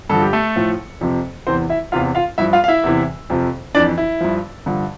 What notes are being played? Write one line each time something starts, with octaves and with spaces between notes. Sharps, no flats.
G2 D3 F3 A4
G4
A3 A4
A2 F3
F2 C3 F3
E2 C3 E3 C4 C5
E4 E5
E2 C3 E3 F4 F5
F4 F5
G2 F3 E4 E5
F4 F5
F5
E4 E5
E2 C3 E3
F2 C3 F3
F2 E3 D4 D5
E4
G2 F3
G2 D3 F3